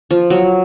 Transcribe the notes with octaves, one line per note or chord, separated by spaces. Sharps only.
F3
F#3